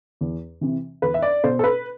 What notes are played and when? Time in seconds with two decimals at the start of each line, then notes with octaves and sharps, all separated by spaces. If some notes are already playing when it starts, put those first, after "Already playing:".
0.21 E2
0.61 C3 E3
1.02 E2 B4
1.14 E5
1.22 D5
1.44 B2 C5
1.59 A4
1.64 B4